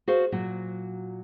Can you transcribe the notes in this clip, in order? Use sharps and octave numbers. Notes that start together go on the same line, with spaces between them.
F#4 G#4 C5 F5
A#2 F#3 F#4